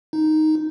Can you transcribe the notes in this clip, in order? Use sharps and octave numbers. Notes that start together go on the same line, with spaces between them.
D#4